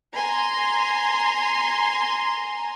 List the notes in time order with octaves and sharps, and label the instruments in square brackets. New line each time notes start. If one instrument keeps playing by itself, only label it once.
[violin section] G#5 A#5 C6